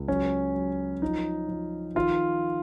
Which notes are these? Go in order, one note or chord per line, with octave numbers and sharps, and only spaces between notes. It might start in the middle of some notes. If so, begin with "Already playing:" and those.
Already playing: C#2 C#3
F#3 C#4
F#3
F3 D#4
F3
D#3 F4